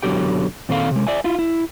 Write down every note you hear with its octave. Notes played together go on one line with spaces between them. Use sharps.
F#2 B2 D3 F#3 G4 G5
A#2 D#3 C4 A4 B4 F5
C3 G#3
D5 E5 G#5
E4 F4
E4